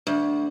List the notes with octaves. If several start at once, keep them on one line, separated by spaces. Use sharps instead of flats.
D2